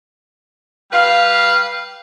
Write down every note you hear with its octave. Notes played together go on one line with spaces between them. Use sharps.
G3 B4 F5